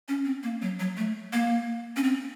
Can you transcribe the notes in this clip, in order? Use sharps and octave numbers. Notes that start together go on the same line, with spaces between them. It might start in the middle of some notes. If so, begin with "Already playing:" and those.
C#4
C4
A#3
F#3
F#3
A3
A#3
C#4
C4